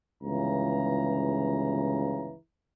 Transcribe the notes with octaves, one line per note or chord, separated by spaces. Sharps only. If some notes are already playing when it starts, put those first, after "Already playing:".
G1 C#2 C#3 E3 A#5